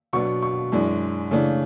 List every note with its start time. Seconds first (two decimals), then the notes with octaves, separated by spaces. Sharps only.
0.13 B2 F#3 B3 D4 C#6
0.42 C#6
0.72 F#2 E3 G#3 D4
1.31 C#3 E3 A3 D4